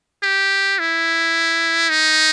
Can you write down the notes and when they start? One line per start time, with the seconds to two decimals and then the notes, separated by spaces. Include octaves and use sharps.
0.23 G4
0.79 E4
1.90 D#4